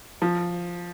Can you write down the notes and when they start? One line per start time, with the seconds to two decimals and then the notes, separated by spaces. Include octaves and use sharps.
0.22 F3